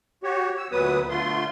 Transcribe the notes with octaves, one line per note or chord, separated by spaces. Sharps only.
F#4 G4 C#5
E6
D2 A#2 F#3 B3 B4 D#6
D3 A3 F4 C6